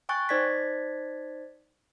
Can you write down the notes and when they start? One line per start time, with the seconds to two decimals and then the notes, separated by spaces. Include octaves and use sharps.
0.09 G5 G#5 C#6 F#6 A6
0.29 D#4 C5 D5 G#6 A6 B6